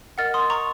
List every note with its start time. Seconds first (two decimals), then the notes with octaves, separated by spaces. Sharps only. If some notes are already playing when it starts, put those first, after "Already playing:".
0.18 A#4 D#5 F#5 F6 A6
0.34 C6 D#6
0.50 A#5 C#6